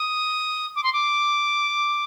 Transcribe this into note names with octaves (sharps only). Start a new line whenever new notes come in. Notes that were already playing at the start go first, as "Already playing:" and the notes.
Already playing: D#6
D6
C6
D6